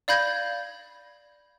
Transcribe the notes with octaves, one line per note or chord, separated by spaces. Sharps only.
D5 F5 B5 G6 G#6 A#6